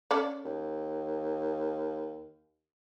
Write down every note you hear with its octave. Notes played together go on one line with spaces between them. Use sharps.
C#4 A4 D5
D#2